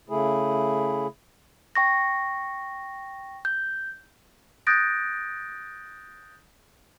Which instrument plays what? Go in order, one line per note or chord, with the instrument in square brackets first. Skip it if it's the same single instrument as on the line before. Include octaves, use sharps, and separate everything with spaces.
[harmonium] C#3 A3 E4 G#4
[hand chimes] G5 C#6 A#6
G6
[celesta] D#6 F#6 G6 A6 A#6 D7